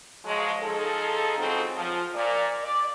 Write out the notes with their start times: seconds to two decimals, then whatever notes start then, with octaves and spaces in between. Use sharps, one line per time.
0.25 F3 F#3 G#3
0.62 F3 D#4 G#4 A4
1.39 G#2 C#3 F3 F#3 C4
1.77 F3
2.15 A#2 D5
2.64 D5